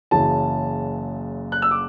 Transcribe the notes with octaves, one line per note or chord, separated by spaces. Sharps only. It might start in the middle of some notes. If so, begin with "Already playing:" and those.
F#1 F#2 C#3 E3 A5
F#6
E6
D6